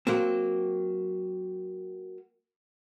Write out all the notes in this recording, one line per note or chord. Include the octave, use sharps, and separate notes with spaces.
F#3 A#3 C4